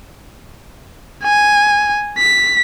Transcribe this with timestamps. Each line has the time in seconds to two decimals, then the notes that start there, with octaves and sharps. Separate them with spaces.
1.24 G#5
2.18 B6